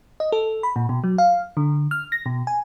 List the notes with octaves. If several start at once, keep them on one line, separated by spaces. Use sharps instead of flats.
D#5
A4
B5
A#2
B2
F#3
F5
D3
F6
A#6
B2
G#5